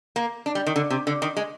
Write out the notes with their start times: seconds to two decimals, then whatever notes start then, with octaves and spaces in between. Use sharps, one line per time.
0.16 A#3
0.46 D4
0.55 G3
0.66 D#3
0.76 D3
0.90 C3
1.07 D3
1.22 D#3
1.37 G#3